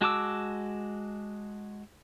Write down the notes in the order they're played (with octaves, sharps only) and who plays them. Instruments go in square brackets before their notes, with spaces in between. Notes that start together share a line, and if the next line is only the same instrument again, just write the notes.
[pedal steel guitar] G#3 F#4 A5 D6 E6